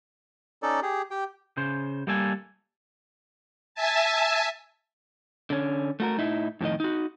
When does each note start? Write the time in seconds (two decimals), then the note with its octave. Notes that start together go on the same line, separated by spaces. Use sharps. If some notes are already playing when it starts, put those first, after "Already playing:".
0.63 C#4 D#4 A4 D5
0.82 G4 G#4
1.11 G4 G5
1.57 C#3 C5
2.07 G3 A#3 A4 G#5
3.75 E5 G#5 A5
5.50 D3 C#4
6.00 A3 F#4 A#4
6.18 A2 D#4 E4
6.61 F2 A2 D#3 D#5
6.80 D#4 F#4